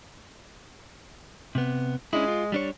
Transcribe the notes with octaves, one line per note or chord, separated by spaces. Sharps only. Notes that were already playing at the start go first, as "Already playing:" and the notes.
C3 B3
G#3 C#4 D4 E4
F4
G3 D4 C#5